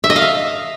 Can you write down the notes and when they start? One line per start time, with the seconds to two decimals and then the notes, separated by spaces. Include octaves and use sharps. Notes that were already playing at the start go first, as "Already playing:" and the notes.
0.04 E5
0.10 D#5
0.16 F5
0.22 E5